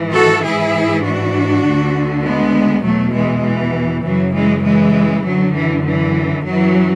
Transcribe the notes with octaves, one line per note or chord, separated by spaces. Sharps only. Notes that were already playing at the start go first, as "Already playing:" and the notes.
Already playing: G#2 E3
F#4 A4
G#2 E3 E4 G#4
D4 F#4
D2 D3
G#3 B3
E2 B2 F#3 A3
E3 G#3
E3
F#2 C#3 E3 F#3
E3 G#3
E3 G#3
F#2 D3 F#3
E3
E3
F#2 E3 F#3